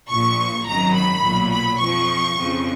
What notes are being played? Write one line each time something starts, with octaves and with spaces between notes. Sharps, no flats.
A#1 A#2 F3 C#6
G#1 F#2 D#3 F#3 A#5
B5
B1 A#2 F#3
B5
F2 F3 C#6
F2 C#3 F3